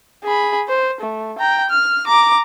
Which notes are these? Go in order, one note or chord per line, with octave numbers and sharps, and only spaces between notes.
G#4 B5
C5
A3
G5 A#5
F6
A#5 D6